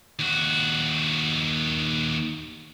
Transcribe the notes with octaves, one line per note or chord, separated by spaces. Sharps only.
D#2 F#4